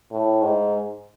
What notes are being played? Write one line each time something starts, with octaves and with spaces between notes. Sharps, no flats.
A2
G#2